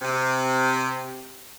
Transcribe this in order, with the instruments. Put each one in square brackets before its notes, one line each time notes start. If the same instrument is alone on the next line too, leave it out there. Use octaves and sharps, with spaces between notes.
[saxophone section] C3